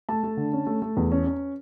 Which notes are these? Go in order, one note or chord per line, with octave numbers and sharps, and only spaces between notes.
A3 A5
A3
D3
C#4
A3
A3
E2
C#4
C#4